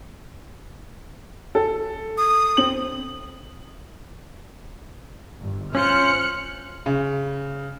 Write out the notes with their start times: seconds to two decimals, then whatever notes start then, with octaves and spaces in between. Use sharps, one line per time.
1.55 A4
2.18 D#6
2.57 C4 F#7
5.39 G1
5.75 C#4 F4 C5 F6 F#6 C#7
6.86 C#3